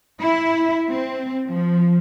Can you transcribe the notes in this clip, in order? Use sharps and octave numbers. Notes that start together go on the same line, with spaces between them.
E4
C4
F3